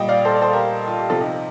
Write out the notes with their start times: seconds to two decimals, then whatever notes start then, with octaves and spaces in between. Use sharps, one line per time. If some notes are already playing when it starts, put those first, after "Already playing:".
Already playing: A#2 G3 D#5 G5
0.08 D5 F5
0.25 A4 C5
0.35 D5
0.42 A4 C5
0.53 G4 A#4
0.87 F4
0.98 G4
1.10 C3 F3 F4 A4
1.20 D#4 G4